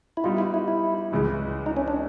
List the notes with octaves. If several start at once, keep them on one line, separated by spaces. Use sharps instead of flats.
E4
G3 B3 D#4 F4 G4
E4
E4
E4
C#2 C#3 E3 G#3
D#4
C#4
D4